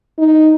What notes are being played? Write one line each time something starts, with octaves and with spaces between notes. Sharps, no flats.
D#4